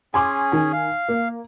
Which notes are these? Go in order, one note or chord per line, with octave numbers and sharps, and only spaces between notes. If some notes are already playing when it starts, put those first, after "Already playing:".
C#4 G#4 G#5 C6 D6
D#3 G#5
F5
A#3